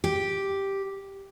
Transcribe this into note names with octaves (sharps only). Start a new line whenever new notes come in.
G4